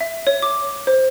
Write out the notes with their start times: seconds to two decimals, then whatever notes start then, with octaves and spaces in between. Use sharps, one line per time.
0.01 E5
0.27 C#5
0.42 D6
0.87 C5